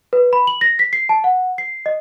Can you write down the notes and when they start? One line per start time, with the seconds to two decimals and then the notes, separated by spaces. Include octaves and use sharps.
0.13 B4
0.33 B5
0.47 F#7
0.61 A#6
0.79 B6
0.93 C7
1.09 A5
1.24 F#5
1.58 C7
1.86 D#5